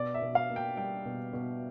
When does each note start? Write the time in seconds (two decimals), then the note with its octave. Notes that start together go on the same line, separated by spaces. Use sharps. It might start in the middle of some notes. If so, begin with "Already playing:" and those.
Already playing: B2 D5
0.14 E5
0.22 B2
0.35 F5
0.49 A#3
0.56 G5
0.77 G3 G5
1.05 B2
1.33 B2